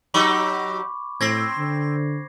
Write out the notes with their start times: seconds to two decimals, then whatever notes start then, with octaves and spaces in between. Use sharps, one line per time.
0.14 F#3 D#4 G4 B5 C#6 D6
1.21 A2 C4 G#6 A#6 C7
1.58 D3